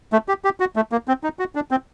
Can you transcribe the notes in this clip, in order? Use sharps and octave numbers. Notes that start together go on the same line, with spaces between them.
A3
G4
G4
F#4
A3
A#3
C4
D#4
F#4
D4
C4